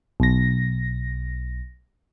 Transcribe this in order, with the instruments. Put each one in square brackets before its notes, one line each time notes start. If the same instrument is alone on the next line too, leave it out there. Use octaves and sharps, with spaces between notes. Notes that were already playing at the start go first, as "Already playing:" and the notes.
[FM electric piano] B1 A#6